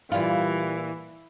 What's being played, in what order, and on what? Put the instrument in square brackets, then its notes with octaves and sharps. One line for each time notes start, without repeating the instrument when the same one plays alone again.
[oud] A#2 G3 F4 [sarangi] E3